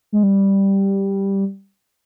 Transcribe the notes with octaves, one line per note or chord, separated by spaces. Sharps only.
G#3
G3